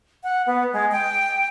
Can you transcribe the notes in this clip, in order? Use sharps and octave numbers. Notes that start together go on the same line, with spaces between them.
F#5
B3
G#3
G5